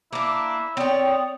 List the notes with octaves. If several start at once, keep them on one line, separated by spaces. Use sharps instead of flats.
A#3 D4 E4
C4 C#5 D5 G5 D#6